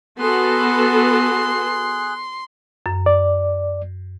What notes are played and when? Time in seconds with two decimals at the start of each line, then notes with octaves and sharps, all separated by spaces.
0.20 B3 F#4 G#4 A4 C6 F#6
2.86 F#2
3.06 D5